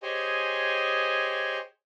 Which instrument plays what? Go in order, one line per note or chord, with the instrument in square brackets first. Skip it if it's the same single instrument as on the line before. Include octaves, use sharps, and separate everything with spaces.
[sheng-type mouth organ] G4 G#4 C5 C#5 D#5 G#5